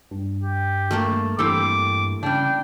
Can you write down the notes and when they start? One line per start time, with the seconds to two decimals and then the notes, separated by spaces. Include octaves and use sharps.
0.11 G2
0.42 G4
0.91 A3 A#3 A4
1.39 G2 E3 C4 G4 A4 D6
2.23 C#3 G3 D4 G5